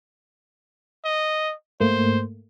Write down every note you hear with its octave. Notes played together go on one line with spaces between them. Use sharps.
D#5
G#2 A3 A#3 C5